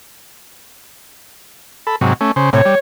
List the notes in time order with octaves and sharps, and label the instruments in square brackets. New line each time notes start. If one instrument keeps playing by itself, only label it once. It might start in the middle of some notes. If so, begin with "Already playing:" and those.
[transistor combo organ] A4 B5
G#2 C3 F#3
A3 C#4
C#3 C5
[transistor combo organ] A2 C3 [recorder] C#5
[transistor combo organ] G3